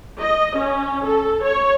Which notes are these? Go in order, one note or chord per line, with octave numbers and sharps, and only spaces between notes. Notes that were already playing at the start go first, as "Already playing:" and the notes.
D#5
C#4
A4
C#5